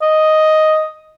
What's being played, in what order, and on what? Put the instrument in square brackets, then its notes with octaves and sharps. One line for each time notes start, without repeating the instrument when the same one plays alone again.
[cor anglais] D#5